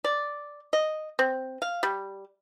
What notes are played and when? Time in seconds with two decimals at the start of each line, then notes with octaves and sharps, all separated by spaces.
0.04 D5
0.73 D#5
1.19 C4
1.62 F5
1.83 G3